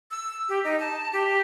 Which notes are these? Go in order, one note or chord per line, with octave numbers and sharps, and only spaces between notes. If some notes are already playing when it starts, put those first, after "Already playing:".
E6
G4
D#4
A5
G4